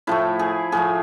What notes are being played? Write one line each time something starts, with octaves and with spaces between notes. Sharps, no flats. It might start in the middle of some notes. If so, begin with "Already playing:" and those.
A2 F3 A3 E4
G#4
A2 F3 A3 G#4